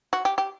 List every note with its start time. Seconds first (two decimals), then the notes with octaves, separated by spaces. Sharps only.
0.13 F#4
0.25 G4
0.38 G4